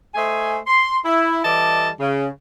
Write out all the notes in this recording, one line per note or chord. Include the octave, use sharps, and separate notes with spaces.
A3 C5 D#5 G#5
C6
E4
E3 G3 A4 D5 D#5 A5
C#3